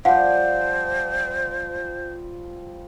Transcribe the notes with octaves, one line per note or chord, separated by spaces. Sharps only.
F3 G3 C5 F5 F#5